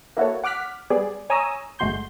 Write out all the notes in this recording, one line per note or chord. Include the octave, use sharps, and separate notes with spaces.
A#3 E4 F#4 A4 C#5
F#5 D6 F6 F#6 B6
G3 B3 G#4 D5
C#5 G#5 A#5 D#6 E6
G1 G#3 A3 F#4 C6 G6